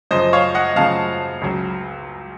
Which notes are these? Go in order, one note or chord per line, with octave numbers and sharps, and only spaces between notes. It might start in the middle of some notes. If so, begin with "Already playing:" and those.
F#2 C#3 F3 C5 D#5
C#5 F5
D#5 F#5
F#2 C#3 F3 F5 A5
C#2 C#3 F#3